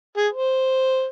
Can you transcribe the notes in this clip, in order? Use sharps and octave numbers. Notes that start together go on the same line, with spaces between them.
G#4
C5